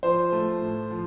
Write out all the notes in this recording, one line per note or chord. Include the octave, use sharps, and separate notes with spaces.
F3 C5
A3
A2
F3